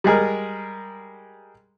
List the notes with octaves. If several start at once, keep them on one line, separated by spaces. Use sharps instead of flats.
G3 G#3 G#4 A#4